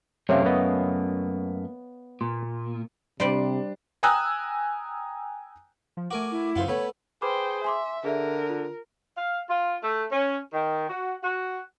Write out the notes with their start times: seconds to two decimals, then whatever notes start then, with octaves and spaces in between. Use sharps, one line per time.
0.29 F#2 C3 A3 A#3 C#5 E5 F5
0.46 B3 D#5
2.21 A#2 C6
3.20 C3 G3 D4 C5 D5
4.03 G5 G#5 A#5 D#6 E6 F#6
5.97 F3
6.11 A3 F#4 A#4 G#5 D6
6.31 E4
6.56 C#2 F#2 F4 C5 F#5
6.68 A3 B3 C#5 B5
7.22 G#4 B4 C5 G5 B5 D6
7.64 E5 G#5 C6 D6
8.04 D3 G#4 A#4 D5 E5
8.50 F4
9.17 F5
9.50 F4
9.83 A3
10.11 C#4
10.53 D#3
10.89 F#4
11.23 F#4